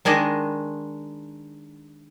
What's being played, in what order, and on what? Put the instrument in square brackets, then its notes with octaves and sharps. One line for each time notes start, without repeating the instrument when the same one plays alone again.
[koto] D#3 G#3 D4 D#5